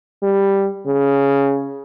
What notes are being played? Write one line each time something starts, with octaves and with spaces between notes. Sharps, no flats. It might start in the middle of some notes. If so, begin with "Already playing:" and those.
G3
C#3